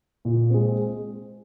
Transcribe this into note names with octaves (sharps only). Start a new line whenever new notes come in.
A#2
G#3 C4